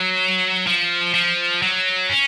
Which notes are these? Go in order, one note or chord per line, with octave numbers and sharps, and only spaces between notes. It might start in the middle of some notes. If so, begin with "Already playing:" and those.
Already playing: F#3
F3
F3
F#3
C#4